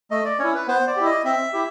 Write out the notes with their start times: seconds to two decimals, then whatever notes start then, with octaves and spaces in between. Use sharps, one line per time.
0.11 A3 D#5
0.25 D5
0.39 C#4 E4 C#5
0.54 B4
0.68 B3 C5
0.87 D5
0.97 E4 G4
1.05 D#5
1.25 C4 E5
1.53 E4 G4